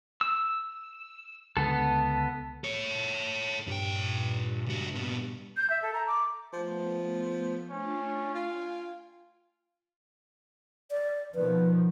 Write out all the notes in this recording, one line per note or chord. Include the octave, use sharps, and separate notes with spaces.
E6
C#2 D3 B3 A4
A4 C#5
G2 A#2 G5
C#2 F#4
A#2 B3
G6
E5
A4
A#5
D6
F3 A3 B3
A3 C#4 D4 F4
F4 F5 G5 G#5
D5
B2 D#3 F3 B4